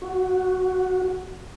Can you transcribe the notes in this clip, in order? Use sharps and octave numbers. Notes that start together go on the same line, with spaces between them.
F#4